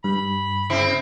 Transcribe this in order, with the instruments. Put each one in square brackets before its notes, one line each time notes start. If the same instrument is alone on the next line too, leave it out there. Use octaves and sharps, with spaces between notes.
[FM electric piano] G2 [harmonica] B5
[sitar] C#3 C4 E4